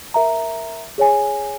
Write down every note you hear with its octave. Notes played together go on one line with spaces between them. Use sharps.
A#4 E5 A#5
G#4 C#5 G#5